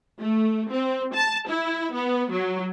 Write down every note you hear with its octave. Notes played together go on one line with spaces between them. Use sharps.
A3
C4
A5
E4
B3
F#3